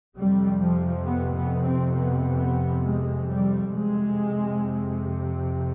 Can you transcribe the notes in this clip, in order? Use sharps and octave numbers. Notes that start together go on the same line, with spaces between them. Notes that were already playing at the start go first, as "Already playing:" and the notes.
F2 C3 G3
F3
B3
B3
C4
B3
B3
G#3
G3
F2 C3 G#3